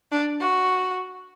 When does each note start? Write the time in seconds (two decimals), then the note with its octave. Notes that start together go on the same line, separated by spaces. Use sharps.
0.12 D4
0.40 F#4